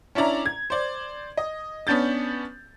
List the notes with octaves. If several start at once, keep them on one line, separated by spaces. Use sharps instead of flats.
C#4 D4 E4 D5 A#5
G#6
C5 D5
D#5
B3 C#4 D4 G6 A6